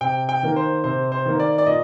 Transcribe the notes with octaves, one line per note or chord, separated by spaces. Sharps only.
C3 G5
G5
D#3 A#3
C5
C3 C5
C5
D#3 A#3
D5
D5
A#2 D#5